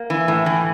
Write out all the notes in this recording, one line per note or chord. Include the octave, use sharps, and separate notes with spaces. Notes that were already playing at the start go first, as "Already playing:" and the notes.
Already playing: A#3
E3
A2
E3